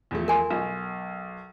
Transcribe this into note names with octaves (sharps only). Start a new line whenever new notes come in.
E2 F3 A3
A#4 G#5 C6
B1